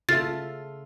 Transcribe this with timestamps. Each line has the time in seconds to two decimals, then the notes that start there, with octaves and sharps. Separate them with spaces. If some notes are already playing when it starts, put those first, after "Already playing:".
0.09 C#3 F4 A4 E5 A6